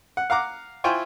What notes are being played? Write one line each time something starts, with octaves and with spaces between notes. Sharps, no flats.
F#5
F5 F#5 A#5 D6
E4 F4 C5 G5 G#5 C#6